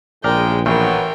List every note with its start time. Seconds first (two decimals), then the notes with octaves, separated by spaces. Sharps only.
0.24 A#1 A2 C#3 G#3 A#4 D5 G5
0.66 A1 F#3 B3 A#4 G5